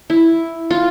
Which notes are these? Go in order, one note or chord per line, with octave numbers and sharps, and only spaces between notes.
E4
F4